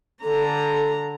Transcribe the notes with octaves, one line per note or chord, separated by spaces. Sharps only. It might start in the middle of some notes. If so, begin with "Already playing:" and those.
D3 A4 A#5